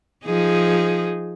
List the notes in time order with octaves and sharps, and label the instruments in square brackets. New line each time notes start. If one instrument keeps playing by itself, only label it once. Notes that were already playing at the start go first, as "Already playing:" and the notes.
[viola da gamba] F3 D#4 G#4